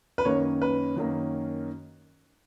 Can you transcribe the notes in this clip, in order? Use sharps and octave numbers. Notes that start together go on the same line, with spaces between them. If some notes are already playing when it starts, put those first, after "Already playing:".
B4
F#2 D#3 A#3 C#4 C#5
B4
F#2 D#3 A#3 C#4